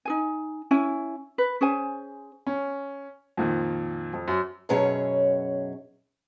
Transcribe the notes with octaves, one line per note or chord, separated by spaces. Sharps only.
D#4 G#4 G#5
C#4 E4 G#5
B4
C#4 G#4 C5 G#5
C#4
F2 A#2 D#3
F2
F#2
F#2 B2 F#3 C#4 G#4 C#5